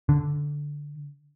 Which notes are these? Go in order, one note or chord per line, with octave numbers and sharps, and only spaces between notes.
D3